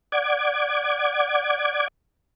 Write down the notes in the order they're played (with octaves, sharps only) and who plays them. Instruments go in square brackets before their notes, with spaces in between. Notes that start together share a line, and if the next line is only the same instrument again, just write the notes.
[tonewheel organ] D5 F#5 D6 G#6